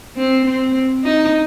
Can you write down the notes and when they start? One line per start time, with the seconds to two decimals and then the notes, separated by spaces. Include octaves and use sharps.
0.17 C4
0.45 C4
1.03 D#4